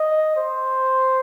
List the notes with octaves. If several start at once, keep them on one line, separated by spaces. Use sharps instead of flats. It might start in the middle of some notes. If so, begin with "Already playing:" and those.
Already playing: D#5
C5